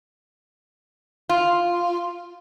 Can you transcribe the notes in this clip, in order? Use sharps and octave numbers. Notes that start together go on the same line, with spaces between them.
F4